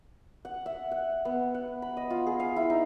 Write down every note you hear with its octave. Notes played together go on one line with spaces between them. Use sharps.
F#5
E5
F#5
B3
F#5
B5
D#5
F4
G#4
F5
E4
D#4